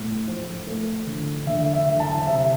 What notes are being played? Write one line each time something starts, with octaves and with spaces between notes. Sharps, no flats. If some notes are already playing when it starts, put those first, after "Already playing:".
Already playing: A2 A3
F3
A3
D3
D3 E5
E5
D3
A5
C3 E5